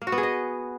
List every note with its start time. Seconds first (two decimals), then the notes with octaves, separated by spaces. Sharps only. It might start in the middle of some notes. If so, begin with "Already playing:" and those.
0.02 A#3
0.07 F#4
0.12 B3
0.18 G#4
0.23 D#5